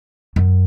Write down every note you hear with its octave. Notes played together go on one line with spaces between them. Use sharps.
F#2